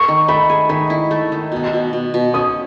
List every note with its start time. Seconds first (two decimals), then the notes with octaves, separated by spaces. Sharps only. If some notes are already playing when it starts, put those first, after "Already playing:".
Already playing: C#6
0.08 D#3
0.28 A3 B5
0.50 G#4
0.69 D#3 B5
0.90 E4
1.11 A3
1.32 D#3
1.52 B2
1.73 B2
1.93 B2
2.14 B2
2.34 C#4 D#6